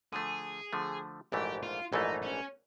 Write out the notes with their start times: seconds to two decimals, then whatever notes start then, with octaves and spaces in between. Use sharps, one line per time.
0.13 D3 F3 A3 G#4
0.73 D3 F3 A3
1.32 A#1 G#2 E3 A3 G4
1.63 F4
1.92 A#1 G#2 E3 A3 D#4
2.22 C#4